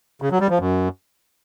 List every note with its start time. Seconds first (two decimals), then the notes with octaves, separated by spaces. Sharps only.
0.22 C#3
0.31 F#3
0.41 G3
0.50 F3
0.59 F#2